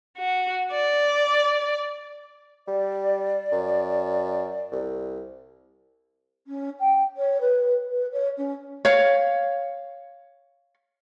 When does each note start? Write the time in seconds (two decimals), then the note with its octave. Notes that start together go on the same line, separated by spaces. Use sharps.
0.18 F#4
0.72 D5
2.67 G3 D5
3.52 F#2
4.72 C2
6.47 C#4
6.79 G5
7.17 C#5
7.40 B4
7.90 B4
8.12 C#5
8.37 C#4
8.85 C#5 F5